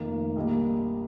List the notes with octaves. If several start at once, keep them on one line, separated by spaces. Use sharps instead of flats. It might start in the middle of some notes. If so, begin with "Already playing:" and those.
Already playing: F1 F2 D#3 A#3
A#1 G3 A#3 D#5